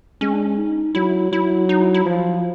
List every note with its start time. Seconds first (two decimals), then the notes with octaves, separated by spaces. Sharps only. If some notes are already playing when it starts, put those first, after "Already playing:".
0.21 G#3 C#4
0.34 D4
0.46 C#4
0.58 D#4
0.95 F#3 E4
1.32 F#3 E4
1.69 D#4
1.82 E4
1.94 E4
2.06 F3 F4